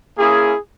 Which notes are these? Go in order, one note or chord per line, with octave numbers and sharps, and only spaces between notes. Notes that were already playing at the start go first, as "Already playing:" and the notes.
A#3 C#4 E4 G#4